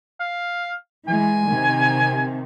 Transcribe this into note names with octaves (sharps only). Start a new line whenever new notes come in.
F5
E3 G#3 G#5
C3 D#3